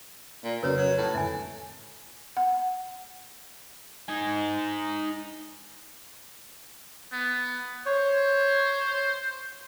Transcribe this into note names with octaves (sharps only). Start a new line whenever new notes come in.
A#2
F1 F#2 C#3 A#4 B4 C#5
F#3
A2
F2 G#2 D3 E5 G#5
F#5
D#4 G#5
B3
C5 C#5